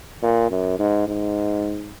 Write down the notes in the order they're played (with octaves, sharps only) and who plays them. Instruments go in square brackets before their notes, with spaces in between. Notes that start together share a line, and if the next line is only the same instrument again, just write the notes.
[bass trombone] A#2
F#2
G#2
G#2